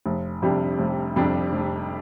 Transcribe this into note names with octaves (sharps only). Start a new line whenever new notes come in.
F1
F2 C3 G3 D4
F1
F2 C3 G3 D4
F1